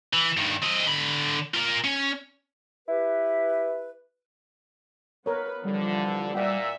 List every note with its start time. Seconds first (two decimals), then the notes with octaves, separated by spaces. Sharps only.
0.13 E3
0.37 G2 D#3
0.62 C4 D#5
0.87 D3 B5
1.54 F4 A#4
1.84 C#4
2.88 E4 G4 B4
5.26 B3 A#4 B4 C#5
5.65 D3 E3 F3 G3
6.35 A#2 D5 E5 F#5 G5